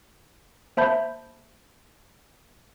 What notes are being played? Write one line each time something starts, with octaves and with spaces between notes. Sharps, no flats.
A#3 C5 E5 A5 B5 G6